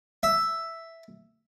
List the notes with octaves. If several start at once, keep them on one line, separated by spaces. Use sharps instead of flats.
E5